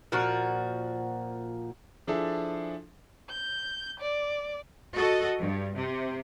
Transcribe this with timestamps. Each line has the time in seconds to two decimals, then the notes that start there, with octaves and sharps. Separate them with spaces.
0.12 A#2 F3 F#4
2.07 F3 D4 E4 G#4 A4
3.29 G6
3.99 D5
4.95 F#4 A4 D#5
5.40 G2
5.76 C3